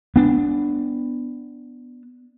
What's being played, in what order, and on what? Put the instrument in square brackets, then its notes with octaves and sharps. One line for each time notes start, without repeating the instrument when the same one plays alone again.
[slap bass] B3 D4